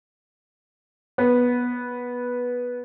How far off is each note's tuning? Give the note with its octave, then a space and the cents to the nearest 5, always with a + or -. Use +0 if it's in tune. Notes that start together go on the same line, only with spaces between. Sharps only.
B3 -10